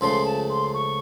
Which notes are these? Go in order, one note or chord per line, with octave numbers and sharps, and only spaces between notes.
C#2 C#3 F3 A3 C6
A5
C6
C#6